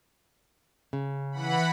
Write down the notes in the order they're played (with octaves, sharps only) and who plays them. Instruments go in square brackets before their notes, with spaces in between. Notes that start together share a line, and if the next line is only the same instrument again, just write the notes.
[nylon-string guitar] C#3
[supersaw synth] E3 F#5 B5